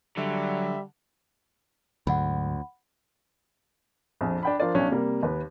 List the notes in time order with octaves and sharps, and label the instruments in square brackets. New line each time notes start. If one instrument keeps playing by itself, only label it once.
[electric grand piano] D3 [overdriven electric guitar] F#3 [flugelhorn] G3 [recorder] E5
[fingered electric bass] D2 [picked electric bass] G#2 D3 F#3 [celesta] F#5 B5
[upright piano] A#1 F2
D4 G5 B5
F3 D4 F4 A#4 C5 D5
B1 C#4 D4
C3 G3 A#3
D#2 B4